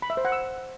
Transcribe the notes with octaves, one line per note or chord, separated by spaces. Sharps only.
B5
E5
C5
F#5
E6